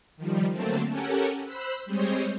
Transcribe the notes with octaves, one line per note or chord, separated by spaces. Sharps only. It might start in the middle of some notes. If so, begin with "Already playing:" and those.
D#3 F3 G3
D3 F#3 A3 A#3 C4 A4
C#4 G4 A4 A#4 F#5 G#5
C5 B5 E6 F#6
G3 G#3 C4 C5 C#5 D#5